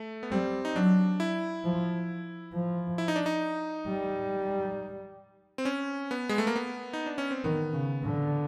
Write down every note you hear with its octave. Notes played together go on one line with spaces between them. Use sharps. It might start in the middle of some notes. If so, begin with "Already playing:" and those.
Already playing: A3
B3
G3 C4
D#4
F#3 D4
E4
F3
F3
E4
D#4
D4
D#4
G3
C4
C#4
B3
G#3
A3
A#3
B3
D#4
D4
C#4
C4
D#3 B3
C#3
D3